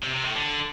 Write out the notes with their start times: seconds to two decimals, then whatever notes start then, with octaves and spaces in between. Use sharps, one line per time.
0.03 C3
0.14 C3
0.25 A2
0.36 D3